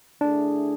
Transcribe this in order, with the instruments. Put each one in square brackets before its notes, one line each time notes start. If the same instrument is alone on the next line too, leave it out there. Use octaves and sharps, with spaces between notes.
[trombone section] D3 A3 E4 G#4 [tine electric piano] D4